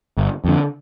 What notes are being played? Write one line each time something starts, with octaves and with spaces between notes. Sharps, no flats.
G1
F2 D3